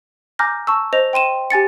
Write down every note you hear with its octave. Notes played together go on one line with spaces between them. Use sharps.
G#5 A#5 D6 F6 G6 A#6
A5 C#6 E6
C5 D#5 A#6 F7
G5 C6 D#7 E7
G4 G#5 A6 C#7